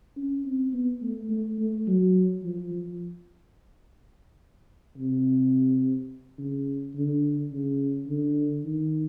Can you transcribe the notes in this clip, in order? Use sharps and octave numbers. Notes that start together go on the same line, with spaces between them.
C#4
C4
B3
A3
A3
A3
F#3
F3
F3
C3
C#3
D3
C#3
D3
D#3